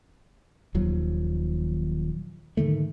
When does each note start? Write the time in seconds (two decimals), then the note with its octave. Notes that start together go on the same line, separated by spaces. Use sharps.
0.74 D#1 D#2 F3 F#3
2.57 G#2 D3 D#3 A3